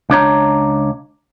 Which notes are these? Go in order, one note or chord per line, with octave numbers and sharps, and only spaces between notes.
C#2 D4 C#5 A#5